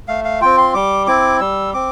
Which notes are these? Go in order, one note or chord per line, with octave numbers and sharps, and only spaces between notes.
A3 F5
F5
C4 F4 G5
C6
G3 D6
C4 E4 D6
G3 E6
C4 D6